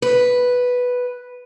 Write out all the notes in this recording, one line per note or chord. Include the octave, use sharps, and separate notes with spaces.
B4